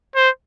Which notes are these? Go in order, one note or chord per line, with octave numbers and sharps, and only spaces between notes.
C5